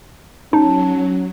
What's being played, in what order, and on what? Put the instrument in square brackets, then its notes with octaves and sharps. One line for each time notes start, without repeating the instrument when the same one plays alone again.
[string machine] F#3 [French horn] C#4 [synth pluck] D#4 [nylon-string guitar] A5